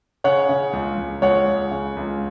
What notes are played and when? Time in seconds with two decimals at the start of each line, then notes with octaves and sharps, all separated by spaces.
0.24 C#3 C#5 F#5
0.49 C#3
0.73 C#2
0.98 C#2
1.22 C#2 C#5 F#5
1.48 C#2
1.71 C#3
1.97 C#2